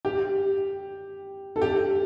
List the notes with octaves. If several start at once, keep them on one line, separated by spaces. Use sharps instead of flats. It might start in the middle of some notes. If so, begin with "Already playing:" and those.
G4
A4
G4